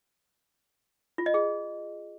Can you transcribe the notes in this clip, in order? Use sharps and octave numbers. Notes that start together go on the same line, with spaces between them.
F4
D#5
G#4